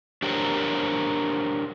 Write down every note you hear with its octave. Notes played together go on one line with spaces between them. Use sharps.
D4 G4 A#4 C5 C#5